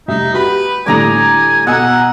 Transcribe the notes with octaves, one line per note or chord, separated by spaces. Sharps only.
F1 G3 D#4 E5
F#4 G4 B4 B5
A2 D3 G3 D5 G#5 A#5 D#6
B2 D#5 F#5 G#5 A#5 E6